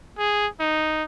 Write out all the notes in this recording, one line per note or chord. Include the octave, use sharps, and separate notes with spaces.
G#4
D#4